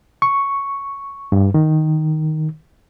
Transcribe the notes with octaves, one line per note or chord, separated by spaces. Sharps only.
C#6
G2
D#3